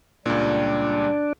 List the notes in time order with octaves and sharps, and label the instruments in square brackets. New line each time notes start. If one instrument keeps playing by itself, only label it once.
[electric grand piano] C#2 A#2 [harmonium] G3 [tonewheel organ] D4